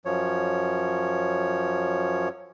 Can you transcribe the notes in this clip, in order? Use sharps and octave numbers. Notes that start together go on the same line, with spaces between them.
F#2 F3 C#5